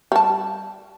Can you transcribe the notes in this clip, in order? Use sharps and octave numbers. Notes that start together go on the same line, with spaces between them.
G3 A5